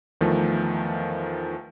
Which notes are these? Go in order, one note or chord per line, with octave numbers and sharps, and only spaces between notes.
E2 D#3 F3 A3